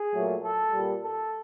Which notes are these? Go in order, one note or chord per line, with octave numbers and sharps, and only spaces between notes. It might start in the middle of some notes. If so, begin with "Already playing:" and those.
Already playing: G#4
A#2 F#3 A3
A4
A#2 G3
A4